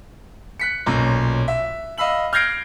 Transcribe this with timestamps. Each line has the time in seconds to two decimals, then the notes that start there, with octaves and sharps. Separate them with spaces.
0.60 F#6 B6 C#7
0.86 B1 A#2 C#4 A#5
1.48 E5
1.98 D#5 F5 B5 E6 F#7
2.33 F6 G6 G#6 A#6 C7 D7